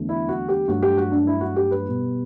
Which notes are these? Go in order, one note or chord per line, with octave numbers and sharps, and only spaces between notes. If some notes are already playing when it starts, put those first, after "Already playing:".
Already playing: E2 D3 F#3 A3
E4
F#4
G4
G2 F#3 A3 F#4
G4
F#4
D4
E4
F#4
G4
B4
B2 G3